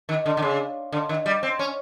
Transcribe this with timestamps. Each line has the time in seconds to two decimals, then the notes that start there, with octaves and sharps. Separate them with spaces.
0.09 D#3
0.26 D3
0.37 D3
0.42 C#3
0.92 D3
1.09 D#3
1.26 G3
1.43 C4
1.59 C#4